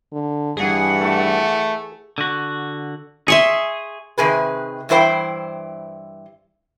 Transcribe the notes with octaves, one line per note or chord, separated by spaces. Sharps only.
D3
G2 E3 G#4 F#5
A3
D3 F#4
G#4 E5 C6 C#6
C3 D#3 G#4 B4
G2 E3 E4 C5 G5